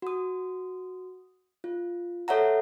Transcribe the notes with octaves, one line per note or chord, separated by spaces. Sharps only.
F#4 D#6
F4
A4 C#5 E5 F#5 A#5